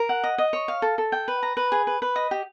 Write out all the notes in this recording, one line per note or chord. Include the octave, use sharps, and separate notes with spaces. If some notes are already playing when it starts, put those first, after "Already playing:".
Already playing: A#4
F#5
D#5
D#5
C#5
F5
A4
A4
G5
B4
A#5
B4
G#4
B4
B4
D#5
G4